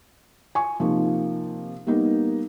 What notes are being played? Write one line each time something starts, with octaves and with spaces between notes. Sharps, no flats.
G#5 C#6
C3 F3 A#3 D#4
G3 A#3 B3 D#4